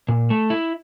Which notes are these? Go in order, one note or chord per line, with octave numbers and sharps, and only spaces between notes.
A#2
A3
E4